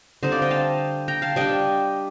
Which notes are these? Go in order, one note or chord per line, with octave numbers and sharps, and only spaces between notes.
D3 G3 C4 D#4 C5 D#5
D5 F5
D#5 G5
F5 A5
G5 A#5
F5 A5
G3 D4 D#5 G5